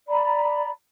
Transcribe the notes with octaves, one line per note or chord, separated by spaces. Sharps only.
D5 A#5 B5